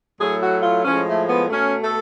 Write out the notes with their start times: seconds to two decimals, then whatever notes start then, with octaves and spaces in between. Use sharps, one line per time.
0.19 A2 F#3 A3 G#4
0.42 F#4
0.63 F4
0.84 A2 F3 G#3 C#4
1.06 A3
1.28 B3
1.50 B2 A3 C#4
1.82 A4